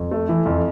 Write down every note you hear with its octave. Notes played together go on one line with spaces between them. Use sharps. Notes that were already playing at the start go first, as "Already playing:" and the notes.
Already playing: F2
A3
E3
F2